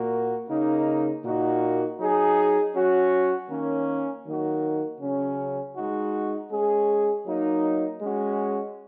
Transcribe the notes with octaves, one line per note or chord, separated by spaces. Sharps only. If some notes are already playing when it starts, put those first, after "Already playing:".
Already playing: A#2 A#3 F#4
C#3 A#3 D#4
A#2 A#3 D#4 F#4
F#3 D#4 G#4
F#3 C#4 F#4
D#3 A#3 C#4
D#3 F#3 A#3 D#4 F#4
C#3 F#3 C#4
G#3 D#4 F#4
G#3 C#4 G#4
F#3 A#3 D#4
G#3 C#4 F#4